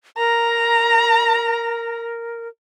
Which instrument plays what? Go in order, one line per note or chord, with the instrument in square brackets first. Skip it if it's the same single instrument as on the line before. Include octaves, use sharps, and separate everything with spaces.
[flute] A#4 [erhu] A#5